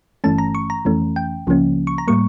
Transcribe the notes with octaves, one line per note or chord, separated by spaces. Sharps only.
G1 G2 E3 A3 C#4 A5
A#5
C#6
A#5
F2 E3 A3 C#4
G5
C#2 C#3 F3 A#3 C#4
C#6
A#5
A2 G3 A#3 C#6